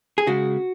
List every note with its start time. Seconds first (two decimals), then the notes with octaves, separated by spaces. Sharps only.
0.18 G#4
0.27 C#3 G#3 F#4